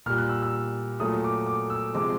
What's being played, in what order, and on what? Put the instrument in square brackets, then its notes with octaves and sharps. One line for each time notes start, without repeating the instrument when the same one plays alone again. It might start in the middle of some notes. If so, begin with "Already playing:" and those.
[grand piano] A#2 G3 F6
F#6
E6
E6
A#2 F#3 A3 D#6
D6
D6
E6
C3 F3 G#3 D6